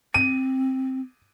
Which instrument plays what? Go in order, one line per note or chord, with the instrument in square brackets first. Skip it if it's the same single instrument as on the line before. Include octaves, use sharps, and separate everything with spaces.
[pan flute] C4 [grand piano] D#7